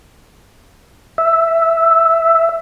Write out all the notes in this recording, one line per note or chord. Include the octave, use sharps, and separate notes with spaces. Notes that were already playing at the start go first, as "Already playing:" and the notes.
E5